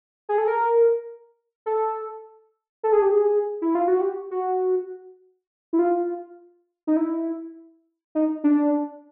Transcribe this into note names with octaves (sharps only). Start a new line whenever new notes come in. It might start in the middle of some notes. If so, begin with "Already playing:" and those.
G#4
A4
A#4
A4
A4
G#4
G4
G#4
E4
F4
F#4
G4
F#4
E4
F4
D#4
E4
D#4
D4